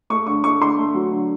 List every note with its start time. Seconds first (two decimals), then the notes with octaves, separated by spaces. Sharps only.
0.10 A3 C#6
0.27 D3 C#6
0.43 A3 C#6
0.61 D3 C6
0.78 A3
0.95 F#3
1.12 D3